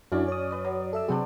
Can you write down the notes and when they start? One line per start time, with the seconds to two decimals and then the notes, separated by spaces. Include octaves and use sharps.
0.12 F#2 C#4 D4 E4 F#4 D5
0.28 C#5 D#6
0.51 B4 D5
0.65 F#3 A#5
0.93 A4 E5 E6
1.08 C3 F#3 B3 C4 D4 G#4